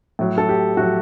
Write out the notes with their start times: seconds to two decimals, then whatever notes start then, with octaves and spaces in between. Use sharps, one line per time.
0.19 A2 F#3
0.38 A4
0.49 G4
0.77 A2 F#3 F#4